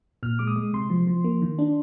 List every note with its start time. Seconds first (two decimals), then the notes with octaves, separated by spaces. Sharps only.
0.23 A#2 F6
0.39 G#3 D6
0.47 D#6
0.56 G#3
0.73 C3 C6
0.90 F3
1.07 F3
1.24 A#3
1.42 D#3
1.59 D4